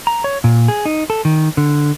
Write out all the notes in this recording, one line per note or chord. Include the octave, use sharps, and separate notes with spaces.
A#5
C#5
A#2
G#4
D#4
A4
D#3
D3